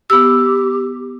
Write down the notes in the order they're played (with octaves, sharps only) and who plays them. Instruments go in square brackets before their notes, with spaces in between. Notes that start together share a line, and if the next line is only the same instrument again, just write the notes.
[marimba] B3 E6 [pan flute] G4